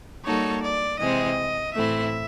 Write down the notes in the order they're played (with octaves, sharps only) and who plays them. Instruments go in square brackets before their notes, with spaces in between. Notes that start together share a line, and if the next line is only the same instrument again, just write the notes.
[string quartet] G3 A#3 D#4 F#4 A4 [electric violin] C#5
[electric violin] D5
[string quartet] C3 E3 G#3 C4 [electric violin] D#5
[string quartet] A2 E3 A3 C4 E4 [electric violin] E5